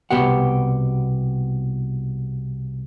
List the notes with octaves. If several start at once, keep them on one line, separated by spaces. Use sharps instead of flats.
C2 B2 B3 G4 F#5